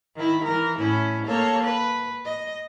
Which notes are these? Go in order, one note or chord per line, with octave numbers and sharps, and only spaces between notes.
D#3 E4
E3 A#4
A2 C#4 E4
A#3 A4 C#5
B4
D#5